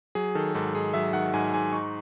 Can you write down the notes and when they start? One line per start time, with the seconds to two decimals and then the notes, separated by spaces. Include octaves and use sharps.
0.15 F#3 G#4
0.35 D#3 A4
0.55 G#2 A4
0.74 G#2 G#4
0.94 F#3 E5
1.13 D#3 F#5
1.34 G#2 G#5
1.54 G#2 G#5
1.73 D#4 C#6